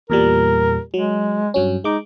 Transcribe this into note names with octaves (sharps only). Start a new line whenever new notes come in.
E2 A#2 G3 A#4
F#3 G#3
G2 F#3 C#4
G#3 D#4 D6